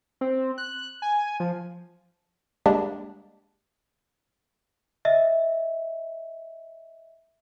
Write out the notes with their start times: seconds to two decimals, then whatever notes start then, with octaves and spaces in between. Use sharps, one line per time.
0.21 C4
0.58 F#6
1.02 G#5
1.40 F3
2.66 G3 G#3 A#3 D4 G4
5.05 D#5 E5